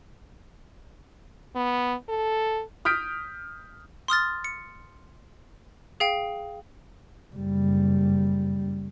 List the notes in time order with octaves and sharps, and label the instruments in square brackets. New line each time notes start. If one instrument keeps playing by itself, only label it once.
[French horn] B3
A4
[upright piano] D#6 F6 G6 B6 D7
[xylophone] C6 D#6 F6 A6
C#7
G#4 F5 G5
[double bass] F#1 G3